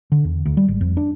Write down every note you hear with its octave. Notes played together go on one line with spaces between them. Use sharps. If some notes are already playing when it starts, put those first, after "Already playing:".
D3
E2
D2
G3
G#1
F2
D4